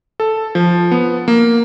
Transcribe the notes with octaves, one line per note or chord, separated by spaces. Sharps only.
A4
F3
B3
A#3